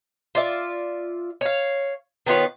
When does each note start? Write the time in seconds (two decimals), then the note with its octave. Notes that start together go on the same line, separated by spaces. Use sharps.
0.35 F4 D5 E5
1.41 C#5 F5
2.26 D#3 B3 F4 C#5